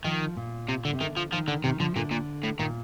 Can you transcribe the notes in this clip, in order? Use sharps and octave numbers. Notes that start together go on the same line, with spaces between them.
D#3 F3
A#2
C3
D3
C3
D3 D#3
F3
D#3 F3
D3
C3 D#3
D3 F3
A#2 D3
A#2
A2
A#2 D#3